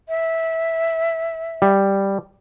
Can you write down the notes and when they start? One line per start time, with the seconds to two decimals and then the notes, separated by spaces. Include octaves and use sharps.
0.09 E5
1.62 G3